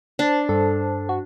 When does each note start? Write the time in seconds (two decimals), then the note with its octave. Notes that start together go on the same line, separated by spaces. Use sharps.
0.19 D4 C5 A5
0.49 G2 A4
1.09 F#4